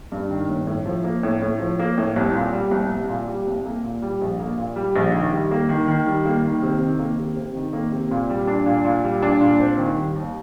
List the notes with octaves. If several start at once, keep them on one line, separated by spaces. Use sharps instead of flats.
G2
D#3
G1
A2
F3
A#3
A2
A2
F3
A#3
A2
C2
A#2
G3
C2
C2
A#2
G3
C2
A#3
A#2
G3
A#1
A#3
A#2
G3
A#1
D#3
G3
A#3
D#3
D#3
G3
A#3
D#3
C3
D#3
A#3
C3
C3
D#3
A#3
C3
A#2
G3
D4
A#2
A#2
G3
D4
A#2
C4
D#3
G3
D#2